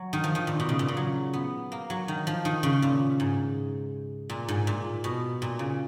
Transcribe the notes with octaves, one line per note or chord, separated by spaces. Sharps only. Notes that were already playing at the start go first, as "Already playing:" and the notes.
Already playing: F#3
D#3
F3
D#3
A#2
B2
C#3
A#2
C#3
F#3
B3
A#3
F#3
D#3
F3
D#3
C#3
A#2
G#2
A#2
G#2
A#2
B2
A#2
C#3